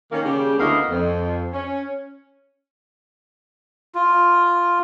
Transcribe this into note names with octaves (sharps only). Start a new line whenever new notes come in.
D#3 A#3 C#4
C#3 G3 G4
D2 A#3 B3 E4 D#5 F5
F2
C#4
F4